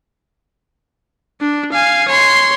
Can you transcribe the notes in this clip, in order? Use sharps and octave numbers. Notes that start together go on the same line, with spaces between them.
D4
F5 G#5
C#5 C6